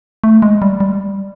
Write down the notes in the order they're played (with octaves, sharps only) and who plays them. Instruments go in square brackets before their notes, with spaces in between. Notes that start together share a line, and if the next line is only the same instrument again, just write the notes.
[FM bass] A3
G#3
G3
G3